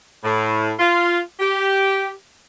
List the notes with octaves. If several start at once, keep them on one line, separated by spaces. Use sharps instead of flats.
A2
F4
G4